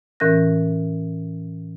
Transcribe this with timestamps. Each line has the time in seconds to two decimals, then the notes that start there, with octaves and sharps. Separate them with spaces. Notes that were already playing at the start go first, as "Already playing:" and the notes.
0.20 A2 E3 C#4 A#4 F#6 A#6